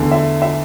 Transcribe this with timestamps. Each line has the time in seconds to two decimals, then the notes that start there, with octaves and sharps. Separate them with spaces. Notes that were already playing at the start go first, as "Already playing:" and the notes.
Already playing: E2 D3 A3
0.11 E5
0.42 E5